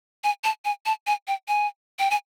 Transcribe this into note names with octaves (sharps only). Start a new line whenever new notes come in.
G#5
A5
G#5
A5
G#5
G5
G#5
G5
G#5